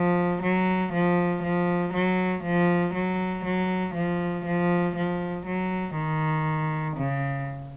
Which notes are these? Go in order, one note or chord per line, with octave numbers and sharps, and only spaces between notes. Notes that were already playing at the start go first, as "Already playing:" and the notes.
Already playing: F3
F#3
F3
F3
F#3
F3
F#3
F#3
F3
F3
F3
F#3
D#3
C#3